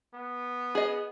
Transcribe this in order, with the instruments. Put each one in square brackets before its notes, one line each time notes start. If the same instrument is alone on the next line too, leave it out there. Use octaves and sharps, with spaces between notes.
[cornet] B3
[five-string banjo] G#4 D#5